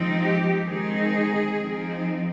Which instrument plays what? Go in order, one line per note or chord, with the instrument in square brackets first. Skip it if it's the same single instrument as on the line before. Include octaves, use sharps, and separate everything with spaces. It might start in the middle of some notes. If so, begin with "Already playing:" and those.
Already playing: [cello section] F3 G#3 C4 D#4
G4
D#3 G#3 C4 D#4 G#4
F3 C4 D#4